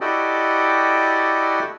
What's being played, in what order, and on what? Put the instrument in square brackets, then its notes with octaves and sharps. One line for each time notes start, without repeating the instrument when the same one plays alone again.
[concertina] E4 F#4 G4 A4 D5 D#5